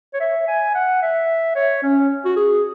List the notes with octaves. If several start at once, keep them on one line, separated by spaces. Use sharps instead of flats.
C#5
E5
G#5
F#5
E5
C#5
C#4
F#4
G#4